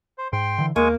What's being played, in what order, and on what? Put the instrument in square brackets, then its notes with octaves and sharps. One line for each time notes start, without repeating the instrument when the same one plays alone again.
[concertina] C5
[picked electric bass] G#2 [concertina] G5 C6
[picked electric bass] D3 E3
[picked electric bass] D#2 [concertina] G#3 G#5 C#6 [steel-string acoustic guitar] A#3